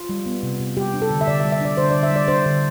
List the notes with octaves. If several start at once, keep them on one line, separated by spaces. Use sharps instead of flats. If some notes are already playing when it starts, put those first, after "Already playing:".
Already playing: F4
G3
B3
C3
C3
G3 G4
D4
A4
D3
E5
D3 D5
E5
G3
E5
D4 D5
D3 C5
D3 D5
E5
G3 D5
D4 C5
D3